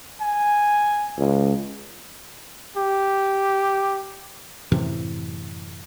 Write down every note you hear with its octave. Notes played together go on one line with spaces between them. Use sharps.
G#5
C#2
G4
F#2 A2 C3 E3